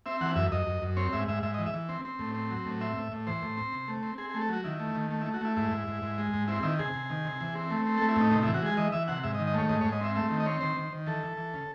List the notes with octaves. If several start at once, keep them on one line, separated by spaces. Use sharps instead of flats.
C4 E5
E3 F#5
F#2 E5
F#2 D#5
F#2
F#2
C4 C#5
G#2 E5
G#2 E5
G#2 E5
D#5
E3
E5
E3
C4
C4
A2
C4
F#3
A2
C4 E5
A2
A2
E3 C5
A2
C4
C3
A3
C4
C4 G#4
G#4
A3
A4
F#3 F#4
D#3 E4
A3
D#3
A3
E4
A3
F#4
A3 E4
G#2 E4
G#2
G#2
G#2
G#3
G#2
C4 E4
D#3 E4
C3 G#4
C3
D#3
C3
E3
C4
A3
C4
A4
A3
E4
A2 D#4
C3 D#4
E4
E3
F#4
G#3 G#4
E3 D#5
E3 E5
C3 F#5
G#2 E5
D#5
D#3
D#5
A3 C#5
G#2 D#5
C#5
G#2
D#5
C4 E5
A3 E5
D#3
D#5
C4 C#5
D#3 C5
D#3
D#3
E3 A4
E3
E3
C#3